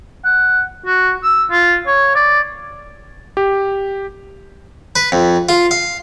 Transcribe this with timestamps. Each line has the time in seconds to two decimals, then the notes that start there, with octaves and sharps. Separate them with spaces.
0.24 F#5
0.86 F#4
1.23 E6
1.51 F4
1.87 C#5
2.15 D5
3.37 G4
4.96 B4
5.12 F2
5.49 F4
5.71 F5